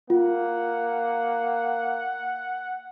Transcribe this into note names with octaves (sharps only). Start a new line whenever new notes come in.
A#3 F4 F#5